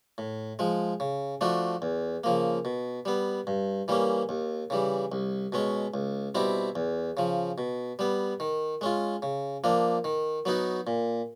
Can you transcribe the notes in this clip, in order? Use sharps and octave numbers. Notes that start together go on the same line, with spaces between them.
A2
F3 G#3
C#3
F3 A3 D4 F#4
E2
C#3 F3 A#3
B2
G3 B3
G2
E3 G3 A#3 C#4
D#2
C#3 E3 G3
C2
B2 G#3 C#4
C#2
B2 G3 C4 E4
E2
C#3 F3
B2
G3 B3
D#3
G#3 C#4 F4
C#3
F3 A#3 D4
D#3
F#3 B3 D#4 F#4
A#2